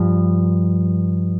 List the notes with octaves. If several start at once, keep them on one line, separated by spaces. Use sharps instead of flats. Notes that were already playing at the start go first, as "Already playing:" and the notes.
Already playing: G2 F3